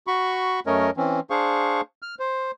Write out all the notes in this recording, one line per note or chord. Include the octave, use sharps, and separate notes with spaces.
F#4 B5 C#6
F#2 A3 C#4 A#4 C#5 D#5
E3 C4 C#4
D4 G#4 C5 F5 C#6
F6
C5